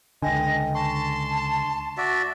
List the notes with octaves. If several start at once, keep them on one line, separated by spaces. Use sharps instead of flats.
C#2 D3 D#5 G5 G#5
A5 C6 C#6
F#4 D5 E5